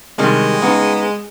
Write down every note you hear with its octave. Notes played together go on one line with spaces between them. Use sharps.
C3 D#3 G3 G#3
C#3 B3 D#4